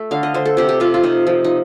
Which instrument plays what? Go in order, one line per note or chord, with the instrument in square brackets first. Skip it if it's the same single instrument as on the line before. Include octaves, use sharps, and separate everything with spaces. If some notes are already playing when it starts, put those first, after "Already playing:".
Already playing: [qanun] A3
D3 F5
D#5
D3 C5
A4
C3 G4
G4
C3 F4
F4
C3 D#4
F3
D#4